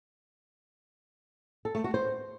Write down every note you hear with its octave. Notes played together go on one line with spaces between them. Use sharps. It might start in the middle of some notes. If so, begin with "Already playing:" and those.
A4
A3
F#4
C5